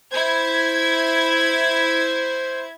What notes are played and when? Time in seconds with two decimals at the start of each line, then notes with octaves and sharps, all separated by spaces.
0.12 E4 C5 G#6